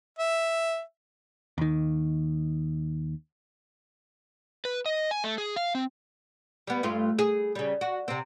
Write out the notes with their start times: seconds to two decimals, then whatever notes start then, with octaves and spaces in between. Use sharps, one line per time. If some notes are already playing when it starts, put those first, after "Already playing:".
0.19 E5
1.58 D#2 D#3
4.65 B4
4.86 D#5
5.11 G#5
5.24 A3
5.38 G#4
5.56 F5
5.75 C4
6.67 G3 B3
6.83 G2 A3 F4
7.19 G#4
7.55 C#3 G3
7.81 F#4
8.08 C3 C4